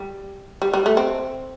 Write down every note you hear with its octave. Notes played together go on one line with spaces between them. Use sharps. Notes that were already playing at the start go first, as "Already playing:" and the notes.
Already playing: G3
G3
G3
A3
C4